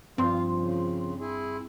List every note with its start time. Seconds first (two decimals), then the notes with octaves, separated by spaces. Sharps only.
0.18 G2 F3 C4 F4 C6
0.58 C#3
1.19 E4 G#4